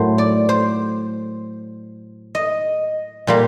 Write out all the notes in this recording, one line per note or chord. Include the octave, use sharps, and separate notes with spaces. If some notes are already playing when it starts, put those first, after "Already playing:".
Already playing: A2 F#3 A3 A#4 C5
D5
C5
D#5
A#2 G3 A#3